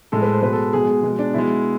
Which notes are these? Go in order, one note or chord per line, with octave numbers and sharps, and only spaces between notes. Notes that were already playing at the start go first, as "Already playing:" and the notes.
A2 G#3 A4
B4
C5
B2 G#3 B4
A4
B2 G#3 G#4
G#4
B2 G#3
D4
B2 G#3 E4